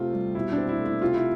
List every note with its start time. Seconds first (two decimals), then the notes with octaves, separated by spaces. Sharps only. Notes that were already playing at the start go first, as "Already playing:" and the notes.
Already playing: C3 A3 C4 F4
0.13 G3
0.35 B2 E4
0.52 D4
0.58 C4
0.69 E4
0.80 A3
0.85 E4
1.02 C3 F4
1.14 E4